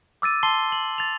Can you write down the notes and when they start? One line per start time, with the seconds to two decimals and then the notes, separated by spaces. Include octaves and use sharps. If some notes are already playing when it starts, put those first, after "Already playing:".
0.22 D6 E6 A6 D#7
0.43 A5 C6 C7 G7
0.72 F#7
0.98 A6 F7